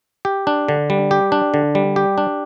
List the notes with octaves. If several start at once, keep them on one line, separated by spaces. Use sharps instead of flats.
G4
D4
D3
G3
G4
D4
D3
G3
G4
D4